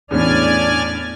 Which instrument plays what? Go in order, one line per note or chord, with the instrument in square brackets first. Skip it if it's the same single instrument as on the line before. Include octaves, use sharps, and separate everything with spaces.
[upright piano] E2 A2 C#4 [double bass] D4 [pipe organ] D5 G#5 F6